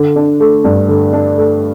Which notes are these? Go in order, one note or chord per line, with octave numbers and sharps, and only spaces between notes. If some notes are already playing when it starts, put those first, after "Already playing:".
Already playing: D3
D4
A3
G2
D3
D4
A3